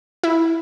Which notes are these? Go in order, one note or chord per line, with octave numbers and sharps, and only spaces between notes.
E4